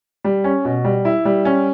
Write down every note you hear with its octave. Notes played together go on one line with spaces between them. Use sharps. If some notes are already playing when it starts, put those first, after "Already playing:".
G3
C#4
B2
G3
E4
G3
C#4